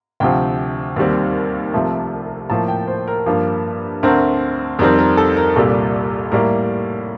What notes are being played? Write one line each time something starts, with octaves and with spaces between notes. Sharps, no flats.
D2 C3 F3 G5
D#2 D#3 G3 C4
C2 C3 F3 A3
A2 F3 A#3 A5
G5
C5
A#4
G2 F3 A#3
D2 D3 A3 C4 A#4
F2 D#3 G3 C4 A#4
A#4
A4
A#4
C2 A#2 G3 A4
A2 G3 A#3 A#4